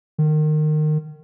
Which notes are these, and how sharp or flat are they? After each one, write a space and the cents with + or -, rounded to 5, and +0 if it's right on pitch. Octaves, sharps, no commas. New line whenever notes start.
D#3 -25